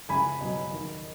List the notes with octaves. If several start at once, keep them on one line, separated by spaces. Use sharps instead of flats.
C#2 G#5 B5
B2 F#3
D#2